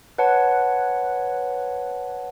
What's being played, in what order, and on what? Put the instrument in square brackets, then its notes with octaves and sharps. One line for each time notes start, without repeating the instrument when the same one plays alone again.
[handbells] B4 C#5 F#5 A5